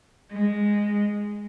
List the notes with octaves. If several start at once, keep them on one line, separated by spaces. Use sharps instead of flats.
G#3